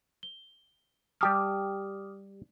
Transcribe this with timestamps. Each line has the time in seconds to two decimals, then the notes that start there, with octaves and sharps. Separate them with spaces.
0.23 G7
1.21 G3 G4 A5 D6 D#6 F6